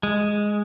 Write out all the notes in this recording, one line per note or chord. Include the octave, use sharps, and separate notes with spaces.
G#3